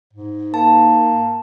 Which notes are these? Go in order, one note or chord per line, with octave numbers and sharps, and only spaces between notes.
G#2
A#3 A5